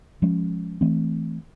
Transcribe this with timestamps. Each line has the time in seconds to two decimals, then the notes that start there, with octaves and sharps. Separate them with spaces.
0.22 F3 G#3 C#4
0.81 E3 A3 C4